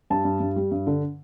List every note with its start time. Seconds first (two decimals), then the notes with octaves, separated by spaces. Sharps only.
0.10 G2 A5
0.25 G2
0.40 G2
0.56 G3
0.72 G2
0.87 D3